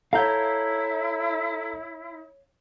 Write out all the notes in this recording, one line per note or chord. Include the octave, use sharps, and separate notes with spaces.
E4 A4 C#5 F5 A#5 G6